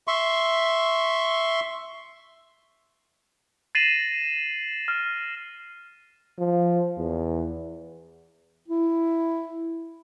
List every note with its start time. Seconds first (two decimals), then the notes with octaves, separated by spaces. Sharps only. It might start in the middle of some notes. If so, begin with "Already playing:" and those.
0.08 E5 C6 C#6
3.75 A6 A#6 C7 D#7 E7 F#7
4.88 F6
6.39 F3
6.97 E2
8.68 E4